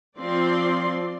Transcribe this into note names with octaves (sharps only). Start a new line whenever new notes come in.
F3 C4 D5 C6